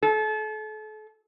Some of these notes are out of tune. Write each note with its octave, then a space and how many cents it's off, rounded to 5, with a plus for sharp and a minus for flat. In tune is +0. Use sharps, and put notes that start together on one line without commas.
A4 -35